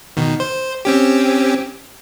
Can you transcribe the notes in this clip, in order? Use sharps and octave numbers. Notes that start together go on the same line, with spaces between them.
B2 D#3
C5
C4 C#4 G4